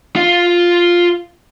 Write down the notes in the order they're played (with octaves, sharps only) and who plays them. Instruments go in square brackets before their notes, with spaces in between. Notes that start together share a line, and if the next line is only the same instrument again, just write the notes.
[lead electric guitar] F4 F5